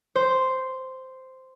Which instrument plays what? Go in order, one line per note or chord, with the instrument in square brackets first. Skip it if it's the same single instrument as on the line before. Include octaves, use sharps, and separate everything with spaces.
[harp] C5